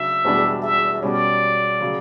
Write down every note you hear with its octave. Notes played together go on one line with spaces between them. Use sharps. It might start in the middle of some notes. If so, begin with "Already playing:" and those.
Already playing: C#3 F#3 D4 F#4 E5
E1 E2 B2 G3 D4
E5
B2 G3 C#4 D5
C#3 F#3